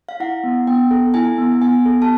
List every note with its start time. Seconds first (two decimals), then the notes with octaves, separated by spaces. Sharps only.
0.09 F5
0.20 E4 F#5
0.44 B3
0.67 B3 G5
0.91 A4
1.14 E4 G#5
1.38 B3
1.62 B3 G#5
1.85 A4
2.02 A5